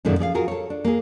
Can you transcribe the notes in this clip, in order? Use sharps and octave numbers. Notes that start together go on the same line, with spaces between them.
F#2 A#2 D3 D#3 G#3
F3 G#4 D5 F5
F4 F#4 G#4 A#4
A4 C#5
D4
A#3 G#4